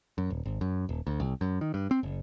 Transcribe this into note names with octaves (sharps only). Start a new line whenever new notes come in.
F#2
D#1
G#1
F#2
D#1
D2
C2
F#2
D#3
G2
C4
F#1